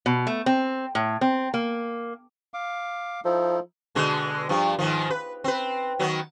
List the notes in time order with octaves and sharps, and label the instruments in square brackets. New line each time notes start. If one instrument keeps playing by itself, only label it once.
[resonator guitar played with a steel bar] B2
A3
C4
A2
C4
A#3
[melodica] F5 D6
[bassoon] F3 [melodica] D#4 E4 A4
[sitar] B2 D3 G#3
G2 F3
G#2 D#3 F3
B4
C4 B4
D#3 F#3 B3